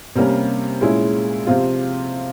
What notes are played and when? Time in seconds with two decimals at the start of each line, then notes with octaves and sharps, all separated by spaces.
0.16 C3 G3 A#3 C#4
0.81 A#2 G#3 C#4 E4
1.47 C3 F3 C4 F4